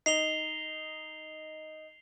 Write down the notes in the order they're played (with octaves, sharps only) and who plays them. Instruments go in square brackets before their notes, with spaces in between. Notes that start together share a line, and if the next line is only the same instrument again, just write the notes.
[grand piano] D#4 [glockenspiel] C7 F7 G7